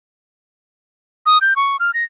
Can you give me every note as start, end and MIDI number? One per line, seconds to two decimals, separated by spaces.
1.26 1.38 87
1.41 1.54 91
1.56 1.77 85
1.80 1.91 89
1.94 2.04 94